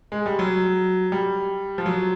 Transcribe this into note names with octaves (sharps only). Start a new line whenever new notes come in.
G#3
G3
F#3
G3
F3
F#3